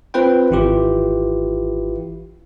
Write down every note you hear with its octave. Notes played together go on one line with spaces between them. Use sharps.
C4 F4 B4 C5 G5
G#1 E3 E4 F4 G4 B4